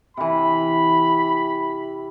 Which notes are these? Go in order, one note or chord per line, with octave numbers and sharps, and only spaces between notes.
C3 E3 B5